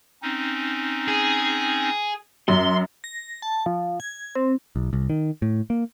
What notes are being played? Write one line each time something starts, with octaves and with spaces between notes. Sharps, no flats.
C4 C#4 D#4
G#4
F#2 C6
A#6
A5
F3
G#6
C4
B1
C2
D#3
A2
A#3